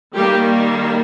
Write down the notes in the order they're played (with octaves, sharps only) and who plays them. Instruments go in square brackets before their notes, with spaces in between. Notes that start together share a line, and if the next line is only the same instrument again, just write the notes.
[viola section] D#3 G3 A#3 G4